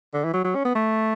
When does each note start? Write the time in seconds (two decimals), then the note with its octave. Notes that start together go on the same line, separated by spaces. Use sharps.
0.14 D3
0.24 E3
0.33 F#3
0.44 F#3
0.55 C#4
0.65 B3
0.75 A3